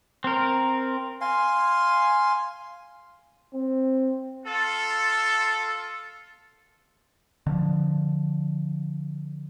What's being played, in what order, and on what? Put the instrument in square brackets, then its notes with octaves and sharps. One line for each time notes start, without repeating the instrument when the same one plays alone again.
[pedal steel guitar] C4 A#4
[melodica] F5 G#5 C6
[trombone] C4
[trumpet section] F4 A4
[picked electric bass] D3 F3